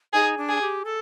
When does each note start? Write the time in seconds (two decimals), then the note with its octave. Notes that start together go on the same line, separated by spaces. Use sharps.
0.13 D#4 G#4
0.38 D4
0.49 G#4
0.61 G4
0.85 A4